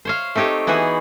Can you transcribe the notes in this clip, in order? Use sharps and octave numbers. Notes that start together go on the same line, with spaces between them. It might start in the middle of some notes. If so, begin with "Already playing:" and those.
C5 C#5 F5
A3 C4 D#4 G4 C#5
E3 B3 D#4 F#4 G#4